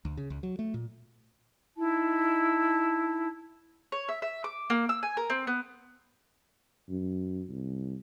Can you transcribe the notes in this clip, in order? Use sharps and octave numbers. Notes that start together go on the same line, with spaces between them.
D2
C#3
C#2
F#3
A3
A#2
D#4 E4 A5
C#5
E5
E5
D6
A#3
E6
G#5
A#4
C4
B3
F#2
C2